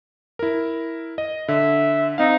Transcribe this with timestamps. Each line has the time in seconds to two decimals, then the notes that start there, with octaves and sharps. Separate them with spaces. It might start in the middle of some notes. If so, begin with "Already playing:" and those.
0.39 E4 A#4
1.18 D#5
1.48 D3 E5
2.18 C4 D#4 F5